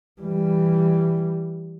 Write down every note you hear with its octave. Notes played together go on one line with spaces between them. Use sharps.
E3 G3